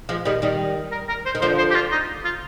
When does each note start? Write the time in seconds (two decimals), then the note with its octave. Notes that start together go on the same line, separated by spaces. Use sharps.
0.09 F3 G#3
0.25 D#3 G3
0.42 D#3 G3
0.92 A#4
1.09 A#4
1.26 C5
1.35 D#3
1.42 D3 F3 C5
1.58 C5
1.71 G4
1.75 F4
1.92 D#4
2.25 F4